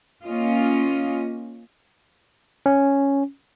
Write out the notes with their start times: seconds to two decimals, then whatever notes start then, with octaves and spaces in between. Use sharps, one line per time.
0.24 A#3 C#4 F4 D#5
2.66 C#4